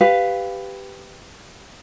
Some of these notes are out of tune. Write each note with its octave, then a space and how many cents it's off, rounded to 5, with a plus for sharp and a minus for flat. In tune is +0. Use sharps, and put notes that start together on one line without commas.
G4 +0 B4 +10 F5 +0